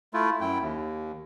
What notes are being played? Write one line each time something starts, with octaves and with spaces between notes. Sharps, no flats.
A3 E4 F4
F#2 E4 G5
D#2